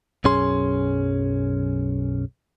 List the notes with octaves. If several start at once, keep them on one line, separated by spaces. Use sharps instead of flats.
B1 F#2 C#4 G#4 C6